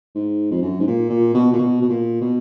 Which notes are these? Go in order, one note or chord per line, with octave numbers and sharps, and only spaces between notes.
G#2
F2
F#2
G#2
A#2
A#2
B2
A#2
B2
B2
A#2
B2